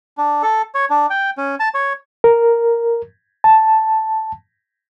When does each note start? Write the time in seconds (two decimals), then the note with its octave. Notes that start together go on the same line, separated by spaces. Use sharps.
0.18 D4
0.43 A4
0.75 C#5
0.90 D4
1.10 G5
1.38 C#4
1.60 A5
1.74 C#5
2.24 A#4
3.44 A5